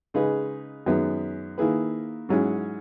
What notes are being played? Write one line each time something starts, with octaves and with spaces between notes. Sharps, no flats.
C#3 G#3 D#4 G#4 B4
F#2 D#3 G#3 B3
D#3 A#3 E4 G#4 B4
G#2 F#3 C#4 E4 G#4